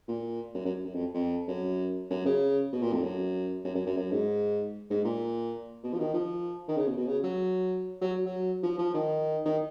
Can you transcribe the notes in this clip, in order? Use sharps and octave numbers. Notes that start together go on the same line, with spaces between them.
A#2
F#2
F#2
F#2
F2
F2
F#2
F#2
C#3
B2
A#2
F2
F#2
F#2
F#2
F#2
F#2
G#2
G#2
A#2
B2
F3
D#3
F3
D#3
C#3
B2
B2
C#3
F#3
F#3
F#3
F3
F3
D#3
D#3